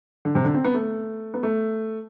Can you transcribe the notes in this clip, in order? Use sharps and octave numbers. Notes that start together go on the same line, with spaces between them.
D3
C3
D3
C4
B3
A3
B3
A3